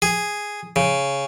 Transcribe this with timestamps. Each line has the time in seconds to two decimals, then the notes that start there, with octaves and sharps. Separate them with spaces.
0.02 G#4
0.76 C#3